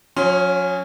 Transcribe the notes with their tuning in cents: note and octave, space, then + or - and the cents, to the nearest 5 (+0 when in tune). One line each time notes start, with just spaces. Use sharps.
F#3 -45 C#4 +0 C6 +0